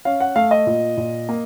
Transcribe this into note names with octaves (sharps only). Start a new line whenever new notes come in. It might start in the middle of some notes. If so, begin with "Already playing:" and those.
C#4 F5
F#5
A3 F5
D#5
A#2
A#2
A#3